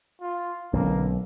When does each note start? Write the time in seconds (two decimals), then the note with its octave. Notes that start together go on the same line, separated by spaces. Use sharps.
0.21 F4
0.73 B1 D3 G#3 A#3 C#4